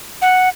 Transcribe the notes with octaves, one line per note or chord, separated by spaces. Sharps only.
F#5